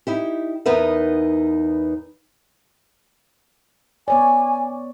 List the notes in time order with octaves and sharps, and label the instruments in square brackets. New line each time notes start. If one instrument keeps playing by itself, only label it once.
[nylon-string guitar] D#4 E4 G4
E2 B3 D#4 A#4 B4 E5
[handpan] B3 C#5 D5 [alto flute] G#5